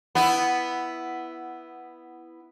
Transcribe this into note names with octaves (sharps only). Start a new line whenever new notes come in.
B3 E4